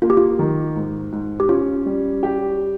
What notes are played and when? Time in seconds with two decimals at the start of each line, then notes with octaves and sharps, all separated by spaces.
0.02 A#3 F4
0.10 G4
0.17 F4
0.39 D#3
0.76 G#2
1.12 G#2
1.40 G4
1.49 C#4 F4
1.86 G3
2.23 G4